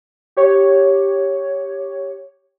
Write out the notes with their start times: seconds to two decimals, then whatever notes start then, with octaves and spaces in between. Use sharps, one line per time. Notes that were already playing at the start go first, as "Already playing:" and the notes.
0.37 G4 C#5